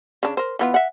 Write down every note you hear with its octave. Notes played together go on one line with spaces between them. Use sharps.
C#3 D4
A#4 C5
E3 B3 F4
E5 F#5